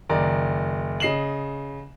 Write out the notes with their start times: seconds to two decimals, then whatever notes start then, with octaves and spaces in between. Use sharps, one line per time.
0.09 F#1 D#3 D5 A#5
1.00 C#3 D#5 C7 E7 F#7